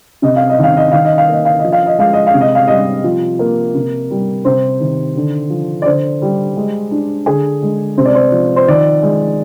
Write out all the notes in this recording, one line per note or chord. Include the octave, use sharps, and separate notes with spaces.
C3 D#5
F5
D#5
D#3 F5
D#5
D#3 F5
D#5
F5
A#3 D#5
F5
F3 D#5
F5
D#5
G#3 F5
D#5
F5
C3
D#5
F5
G3 D#5
F3
A#3
C3
G3
C3 C5
D#3
D3
F3
D5
D3 C5
G3
G#3
D4
D3 G#4
G#3
C3 C5
D5
C5
F3
C5
D#3 D5
G#3